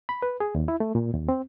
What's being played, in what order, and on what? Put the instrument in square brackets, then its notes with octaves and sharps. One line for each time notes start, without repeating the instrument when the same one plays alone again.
[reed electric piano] B5
B4
G#4
D#2
E4
A3
A#2
D#2
C4